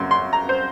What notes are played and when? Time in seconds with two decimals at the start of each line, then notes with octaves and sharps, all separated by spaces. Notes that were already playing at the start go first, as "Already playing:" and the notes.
Already playing: F#2 C#3 A#3 C6
0.11 C6
0.33 A#5
0.49 C5